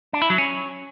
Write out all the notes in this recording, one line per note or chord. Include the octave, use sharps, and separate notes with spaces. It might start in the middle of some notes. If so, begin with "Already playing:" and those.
D4
E4
F#3
C#4